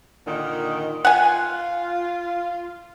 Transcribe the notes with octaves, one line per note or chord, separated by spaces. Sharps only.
A#2 D3 D#3
F4 F#5 G#5